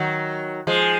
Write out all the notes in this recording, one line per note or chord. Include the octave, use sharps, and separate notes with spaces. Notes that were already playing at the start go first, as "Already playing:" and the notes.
Already playing: D#3 F#3
F3 G#3